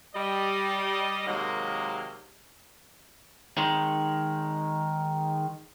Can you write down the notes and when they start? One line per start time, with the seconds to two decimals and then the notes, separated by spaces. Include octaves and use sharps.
0.15 G3 D#5
1.27 C3 D#3 F#3 G#3 A#3
3.58 D#3 G#3